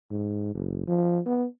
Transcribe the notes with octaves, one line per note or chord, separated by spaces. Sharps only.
G#2
F#1
F3
B3